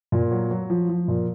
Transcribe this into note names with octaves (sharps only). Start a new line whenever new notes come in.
A#2
F#3
F#3
F3
F3
A#2